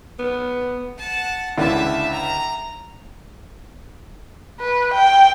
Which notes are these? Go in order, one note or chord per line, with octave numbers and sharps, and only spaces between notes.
B3
F#5 A5
C#2 D3 E4 E5 A5
A#5
B4
G5